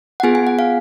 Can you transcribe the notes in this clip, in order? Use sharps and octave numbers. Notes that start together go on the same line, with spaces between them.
F#5
B3 F4 G#4 G#5
G#5
F#5
F5